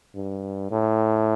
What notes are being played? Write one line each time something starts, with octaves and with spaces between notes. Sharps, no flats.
G2
A2